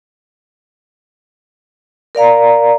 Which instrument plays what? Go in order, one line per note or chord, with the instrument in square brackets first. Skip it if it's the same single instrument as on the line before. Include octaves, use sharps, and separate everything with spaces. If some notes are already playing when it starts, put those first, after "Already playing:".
[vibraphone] A#4 D5 F5 A#5